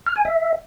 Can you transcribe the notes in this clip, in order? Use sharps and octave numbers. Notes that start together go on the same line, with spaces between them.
F6
G#5
E5